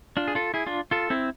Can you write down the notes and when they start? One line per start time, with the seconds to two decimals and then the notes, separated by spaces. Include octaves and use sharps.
0.17 D4 F4
0.28 G#4
0.35 F4 A4
0.54 E4 G#4
0.67 D4 F4
0.91 F4 A4
1.10 C4 E4